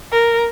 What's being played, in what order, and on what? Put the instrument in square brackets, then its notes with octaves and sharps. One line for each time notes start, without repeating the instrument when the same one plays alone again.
[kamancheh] A#4